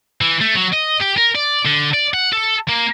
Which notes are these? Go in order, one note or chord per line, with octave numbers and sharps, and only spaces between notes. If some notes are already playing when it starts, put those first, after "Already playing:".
E3
A3
F#3
D#5
G4
A#4
D5
D3
D5
F#5
A4
A#3